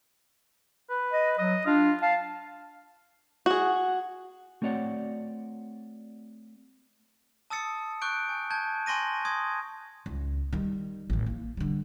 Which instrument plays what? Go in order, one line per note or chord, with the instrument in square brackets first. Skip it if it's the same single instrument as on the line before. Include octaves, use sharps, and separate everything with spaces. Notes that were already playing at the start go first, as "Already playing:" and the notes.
[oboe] B4
[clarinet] D#5
[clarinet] F#3 [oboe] D#5
[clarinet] D4 [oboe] F4
[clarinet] F5 [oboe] A5
[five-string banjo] F#4 G#4
[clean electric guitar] A3 C4 F#4 C#5 D5 F#5
[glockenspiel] A5 D#6 E6 A6 C#7
C#6 D6 F#6 G6 D7
G#5
A5 G6 G#6
G#5 C6 C#6 A#6 D#7
C6 D#6 G#6
[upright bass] C#2
D#3 G3
A1 D#3
A#3
D3 G3